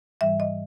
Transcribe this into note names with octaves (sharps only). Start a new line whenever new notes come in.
G#2 E3 G3 E5
D#5